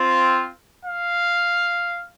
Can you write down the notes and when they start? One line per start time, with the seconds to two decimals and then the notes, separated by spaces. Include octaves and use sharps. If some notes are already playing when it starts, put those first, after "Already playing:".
Already playing: C4 F4
0.83 F5